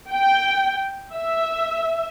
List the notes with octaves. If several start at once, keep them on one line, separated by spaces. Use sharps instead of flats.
G5
E5